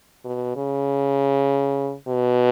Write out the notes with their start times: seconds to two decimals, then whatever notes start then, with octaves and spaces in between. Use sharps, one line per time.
0.25 B2
0.56 C#3
2.08 B2